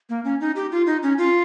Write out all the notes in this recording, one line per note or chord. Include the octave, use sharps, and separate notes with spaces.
A#3
C#4
D#4
G4
F4
D#4
C#4
F4